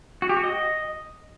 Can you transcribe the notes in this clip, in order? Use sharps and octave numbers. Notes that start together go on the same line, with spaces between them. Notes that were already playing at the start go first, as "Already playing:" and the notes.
F#4
G4
F#4
D#5